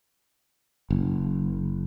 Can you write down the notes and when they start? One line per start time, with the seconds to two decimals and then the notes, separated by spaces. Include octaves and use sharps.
0.90 F#1